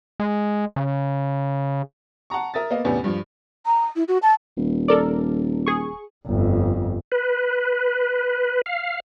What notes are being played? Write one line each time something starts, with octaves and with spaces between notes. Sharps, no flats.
G#3
C#3
F#5 A5 A#5 C#6
A#4 E5 D#6 A6
A#3 B3 D#5 F5
E2 A2 C3 B3 C#4 D4
G2 F3
A#5
E4
F#4
A5
D#1
A4 A#4 D5
G#4 C#6
G1 F2
B4
F5